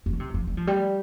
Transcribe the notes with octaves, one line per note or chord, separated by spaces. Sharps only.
G2
D3
C3
F3
G3
F3
G3